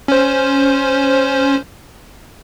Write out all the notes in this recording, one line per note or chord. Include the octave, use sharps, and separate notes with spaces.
C#4 C5